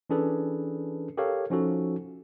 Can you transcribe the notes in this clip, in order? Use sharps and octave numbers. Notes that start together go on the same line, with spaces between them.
E3 C#4 D4 G#4 A4 B4
G4 A4 A#4 C#5 F5
F3 C#4 D#4 F#4 A4